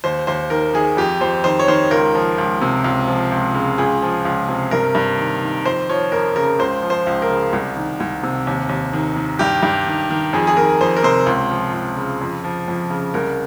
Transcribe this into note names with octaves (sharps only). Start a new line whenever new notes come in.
D#2 C5
D#2 C5
D#3 A#4
D#3 G#4
F2 G4
F2 C5
D#3 C5
C#5
D#3 C5
C#2 A#4
F3
C#2
C3
C#2
F3
C#2
C#3
C#2 G#4
F3
C#2
C3
G2 A#4
G2
D#3
D#3
F2 C5
F3 C#5
F2 A#4
C#3 A#4
C#2 C5
F3
C5
C#2
A#4
C#3
C2
D#3
C2
C3
D#2
D#2
D#3
D#3
G2 G4
G2
D#3
D#3
F2 G#4
G#4
D#3 A#4
F2 C5
A#4
C3 C5
C#2
F3
C#2
C#3
F2
F3
F2
C#3
C2 A#4